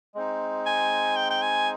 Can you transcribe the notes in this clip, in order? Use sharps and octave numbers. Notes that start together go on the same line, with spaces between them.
G#3 C4 D#4
G#5
G5
G5
G#5